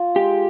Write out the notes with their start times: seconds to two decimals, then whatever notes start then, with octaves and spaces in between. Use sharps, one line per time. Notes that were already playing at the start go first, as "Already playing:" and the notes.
Already playing: F4
0.16 G#3 G4